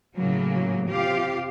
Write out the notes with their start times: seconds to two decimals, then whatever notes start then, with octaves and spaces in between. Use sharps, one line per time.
0.16 A2 C#3 F#3 A#3
0.89 C3 F4 G4 F5